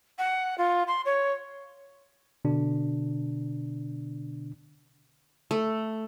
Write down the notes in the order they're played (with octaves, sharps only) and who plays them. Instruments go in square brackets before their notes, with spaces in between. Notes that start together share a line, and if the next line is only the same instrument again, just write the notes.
[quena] F#5
F4
C6
C#5
[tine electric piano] B2 D3 D4
[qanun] A3